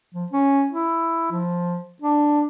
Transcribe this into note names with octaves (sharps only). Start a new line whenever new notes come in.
F3
C#4
E4
F3
D4